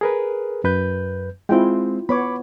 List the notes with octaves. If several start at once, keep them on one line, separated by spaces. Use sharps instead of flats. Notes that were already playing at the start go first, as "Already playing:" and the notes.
G#4 A#4 B4
F#2 B4 G6
G#3 C4 E4 F4 G5
B3 C#5 B5 D6